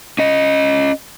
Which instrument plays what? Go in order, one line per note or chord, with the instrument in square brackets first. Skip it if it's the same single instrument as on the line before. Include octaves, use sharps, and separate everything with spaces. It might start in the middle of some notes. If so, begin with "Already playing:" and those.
[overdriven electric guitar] C#4 D#5